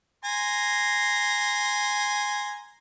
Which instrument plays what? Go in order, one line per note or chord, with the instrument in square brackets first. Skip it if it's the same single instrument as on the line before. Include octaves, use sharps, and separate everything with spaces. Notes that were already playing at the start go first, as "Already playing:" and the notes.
[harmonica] G#5 A#5 C6